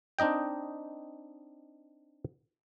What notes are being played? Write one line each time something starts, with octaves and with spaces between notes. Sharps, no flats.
C4 D4 D#4 D#5 G5